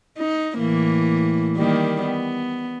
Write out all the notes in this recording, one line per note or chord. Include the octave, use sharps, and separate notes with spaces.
D#4
A2 E3 A#3
D#3 G3 A#3
B3